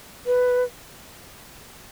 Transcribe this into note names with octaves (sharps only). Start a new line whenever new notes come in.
B4